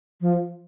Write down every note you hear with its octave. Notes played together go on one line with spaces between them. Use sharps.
F3